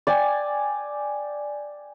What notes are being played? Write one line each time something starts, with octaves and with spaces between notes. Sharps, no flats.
D5 G5 G#5